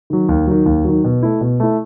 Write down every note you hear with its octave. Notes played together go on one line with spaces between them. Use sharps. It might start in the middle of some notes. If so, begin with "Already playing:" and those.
D#3 F#3
D#2
D#3 F#3
D#2
D#3 F#3
B2
A3 E4
B2
A3 E4